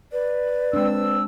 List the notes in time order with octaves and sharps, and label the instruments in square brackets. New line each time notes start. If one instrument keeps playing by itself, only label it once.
[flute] B4 [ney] D5
[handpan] G#3 D4 [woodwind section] C4 E6